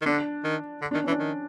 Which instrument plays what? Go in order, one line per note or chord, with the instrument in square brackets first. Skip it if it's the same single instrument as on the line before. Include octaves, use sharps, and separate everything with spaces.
[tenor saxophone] D#3
[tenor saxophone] D3 [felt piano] D4
[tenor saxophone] D#3
D3
[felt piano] D4
[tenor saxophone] D#3
[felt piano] C#4
[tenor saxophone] E3 [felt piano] D4
[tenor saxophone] D#3